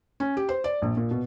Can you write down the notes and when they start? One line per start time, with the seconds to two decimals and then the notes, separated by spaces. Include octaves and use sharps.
0.20 C#4
0.37 G4
0.49 C5
0.64 D5
0.82 A#1
0.97 A#2
1.11 B2